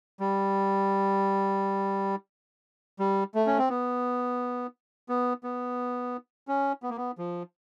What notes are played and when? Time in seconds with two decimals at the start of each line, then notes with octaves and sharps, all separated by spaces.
0.20 G3
2.99 G3
3.35 A3
3.47 C#4
3.58 C4
3.69 B3
5.09 B3
5.44 B3
6.48 C#4
6.83 B3
6.90 A#3
6.97 B3
7.18 F3